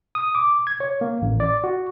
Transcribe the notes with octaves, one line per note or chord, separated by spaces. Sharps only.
D#6
D6
G#6
C#5
A#3
A1
D5
F#4